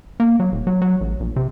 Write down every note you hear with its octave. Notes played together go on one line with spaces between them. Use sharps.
A#3
F#3
D#1
F#3
F#3
A1
A#1
C3